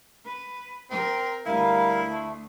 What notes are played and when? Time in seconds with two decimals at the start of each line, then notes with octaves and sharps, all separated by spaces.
0.24 B4
0.90 C4 A#4
1.46 D2 G3 E4 A#4 F5
2.07 A3